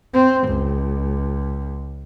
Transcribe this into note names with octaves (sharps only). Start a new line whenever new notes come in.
C4
C#2